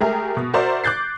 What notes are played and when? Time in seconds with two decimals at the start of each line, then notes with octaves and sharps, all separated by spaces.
0.01 G#3 A3 G4 G#4 A#4
0.37 B2
0.54 F#4 A#4 C5 D5 E5
0.84 D6 F#6 G6 A6 C7